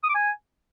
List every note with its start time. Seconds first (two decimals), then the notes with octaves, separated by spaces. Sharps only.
0.03 D#6
0.09 D6
0.15 G#5